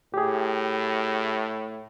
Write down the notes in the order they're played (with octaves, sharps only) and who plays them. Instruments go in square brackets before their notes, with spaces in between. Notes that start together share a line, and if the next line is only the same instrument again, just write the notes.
[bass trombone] A2 [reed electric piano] G4 G#4